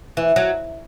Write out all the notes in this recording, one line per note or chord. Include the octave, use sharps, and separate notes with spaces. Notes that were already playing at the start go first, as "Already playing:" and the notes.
E3
F#3